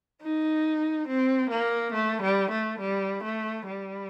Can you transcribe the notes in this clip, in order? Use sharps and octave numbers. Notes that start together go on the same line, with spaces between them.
D#4
C4
A#3
A3
G3
A3
G3
A3
G3